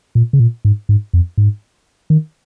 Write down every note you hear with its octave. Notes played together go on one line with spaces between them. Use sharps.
A#2
C#3
A#2
G#2
G#2
F2
G#2
D#3